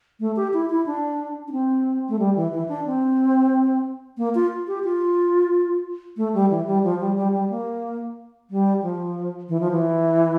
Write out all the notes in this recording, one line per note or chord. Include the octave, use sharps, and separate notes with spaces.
A3
G4
E4
E4
D4
D4
C4
A3
G3
E3
E3
D4
C4
A#3
F4
G4
F4
A3
G3
E3
G3
F3
G3
G3
G3
A#3
G3
F3
E3
F3
E3